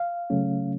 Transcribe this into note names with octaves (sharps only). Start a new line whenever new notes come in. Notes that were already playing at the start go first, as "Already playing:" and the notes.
Already playing: F5
C#3 F#3 A3 C#4